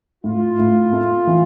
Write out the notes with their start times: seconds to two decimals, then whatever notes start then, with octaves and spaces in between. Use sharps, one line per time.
0.24 A2 F4
0.59 A2
0.93 A3
1.27 E3